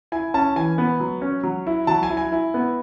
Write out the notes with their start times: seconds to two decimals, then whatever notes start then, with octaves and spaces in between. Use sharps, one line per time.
0.12 E4 G#5
0.34 C#4 A5
0.56 E3 G#5
0.78 B3
1.00 F#3
1.22 C#4
1.43 F#3
1.67 E4
1.87 F#3 A5
2.03 G#5
2.10 E4
2.17 G#5
2.32 E4
2.54 B3